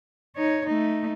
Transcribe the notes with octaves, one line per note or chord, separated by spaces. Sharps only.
D#4 C#5
A3 D#4